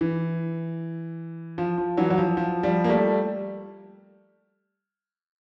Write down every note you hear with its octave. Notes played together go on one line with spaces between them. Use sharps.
E3
F3
F3
E3 F#3
F#3
F3
F3
F3 G3
A#3
G3 A3